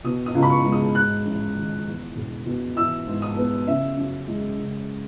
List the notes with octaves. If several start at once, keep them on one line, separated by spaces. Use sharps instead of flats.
B2 D#6
D#6
C#2
B5
C#6
G#3
D#6
G#2 F#6
A1
D#3
E2
E1
B2
E3 E6
G#2
D#6
B3
C#3 E5
F#2
G#3
C#3